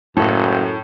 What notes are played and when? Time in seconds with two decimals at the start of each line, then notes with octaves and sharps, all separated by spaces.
0.17 F#1 F#2 A2 A4